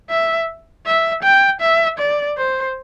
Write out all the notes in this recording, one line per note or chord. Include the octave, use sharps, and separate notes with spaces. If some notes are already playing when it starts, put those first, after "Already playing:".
E5
E5
G5
E5
D5
C5